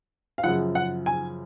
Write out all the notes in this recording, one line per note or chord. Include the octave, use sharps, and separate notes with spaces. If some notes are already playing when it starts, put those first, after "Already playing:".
F5
F#2 C#3 F3 F#5
F#5
G#5